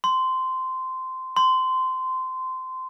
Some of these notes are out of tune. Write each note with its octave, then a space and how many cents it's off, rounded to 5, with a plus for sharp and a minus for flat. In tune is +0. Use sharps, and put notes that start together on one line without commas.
C6 -15
C6 -20